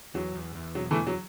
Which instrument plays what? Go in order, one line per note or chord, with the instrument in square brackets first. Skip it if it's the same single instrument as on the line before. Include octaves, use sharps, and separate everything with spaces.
[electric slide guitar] E2 [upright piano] F#3
[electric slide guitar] E2
E2
[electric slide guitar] B2 [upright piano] F#3
[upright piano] E3 A3
[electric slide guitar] E2
[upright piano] F#3